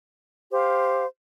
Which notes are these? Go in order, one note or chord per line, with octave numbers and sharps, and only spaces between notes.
G4 C5 F5